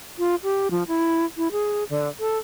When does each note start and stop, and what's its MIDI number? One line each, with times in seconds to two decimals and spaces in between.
0.19 0.35 65
0.43 0.68 67
0.71 0.83 53
0.88 1.25 64
1.37 1.52 64
1.52 1.84 68
1.90 2.09 50
2.20 2.38 69